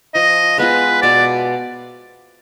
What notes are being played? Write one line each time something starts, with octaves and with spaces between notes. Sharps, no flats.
F3 D#5
G#3 B3 F4 B4
B2 D5